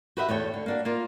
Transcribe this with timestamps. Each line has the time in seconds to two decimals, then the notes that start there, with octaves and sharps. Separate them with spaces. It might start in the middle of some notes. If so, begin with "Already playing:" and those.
0.17 F#4 G4 B4 D#5 E5 F#5
0.29 E2 A3 C#5 G5
0.54 D3
0.66 A#3 D4 F#4
0.85 A#3 F4